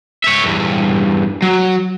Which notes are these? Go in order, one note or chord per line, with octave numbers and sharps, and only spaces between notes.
C#5 E5
E2 G2
F#3